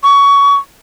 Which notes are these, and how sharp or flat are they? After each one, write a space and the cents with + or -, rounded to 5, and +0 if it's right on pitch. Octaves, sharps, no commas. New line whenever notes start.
C#6 +20